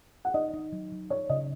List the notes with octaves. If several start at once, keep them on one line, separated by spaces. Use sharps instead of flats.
F#5
D#4 D#5
D#4
F#3
F#3
F#3 C#5
C#3 D#5